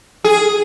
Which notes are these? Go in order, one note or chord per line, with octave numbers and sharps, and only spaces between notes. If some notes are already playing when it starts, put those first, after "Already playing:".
G#4